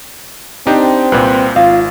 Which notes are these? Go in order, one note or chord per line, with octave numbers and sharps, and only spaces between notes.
C4 D4 D#4 G4 C5
C2 A#2 B4 C5
G#1 F4 F5